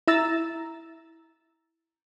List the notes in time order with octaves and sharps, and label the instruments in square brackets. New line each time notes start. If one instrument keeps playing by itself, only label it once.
[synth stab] E4 A#5 E6 A6